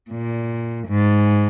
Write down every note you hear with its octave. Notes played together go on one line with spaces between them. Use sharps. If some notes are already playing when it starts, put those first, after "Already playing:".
A#2
G#2